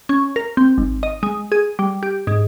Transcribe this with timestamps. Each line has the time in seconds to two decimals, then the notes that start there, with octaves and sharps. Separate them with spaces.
0.09 C#4
0.36 A#4
0.57 C4
0.78 G#1
1.03 D#5
1.23 G#3
1.52 G#4
1.79 G3
2.03 G4
2.27 G#2